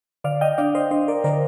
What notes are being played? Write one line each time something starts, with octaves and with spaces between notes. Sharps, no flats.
D3 D5 F5
D#5 G5
D4 D5 F5
C5 D#5
D4 C5 D#5
A#4 D5
D3 A#4 D5